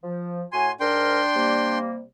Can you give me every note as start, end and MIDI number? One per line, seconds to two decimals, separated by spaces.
0.03 0.42 53
0.52 0.70 45
0.52 0.70 66
0.52 0.70 80
0.52 0.72 84
0.80 1.21 44
0.80 1.78 62
0.80 1.21 70
0.80 1.78 79
0.80 1.78 84
1.35 2.01 48
1.35 2.01 55
1.35 2.01 58